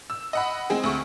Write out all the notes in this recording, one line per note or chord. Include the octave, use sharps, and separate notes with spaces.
E6
D#5 F#5 B5
G#3 C4 G#4
D2 C#6